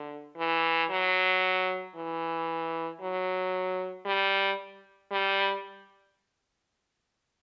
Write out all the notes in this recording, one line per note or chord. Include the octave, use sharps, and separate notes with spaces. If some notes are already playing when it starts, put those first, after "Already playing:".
Already playing: D3
E3
F#3
E3
F#3
G3
G3